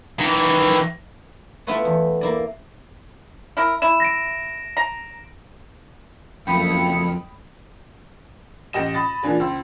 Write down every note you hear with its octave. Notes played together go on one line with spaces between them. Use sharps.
D#3 E3
A3 B3 E4 F4 B4 C#5
E2
A#3 E4 D5
E4 A#4
E4 E7
A#6 D7
A#5
F#1 F2 A3 E4 G5 B5 D#6 C#7
A1 G4 D#5 A#6 E7
B5 D#6 A6
A#2 E3 A#3 D4 G#4
C#2 C5 E6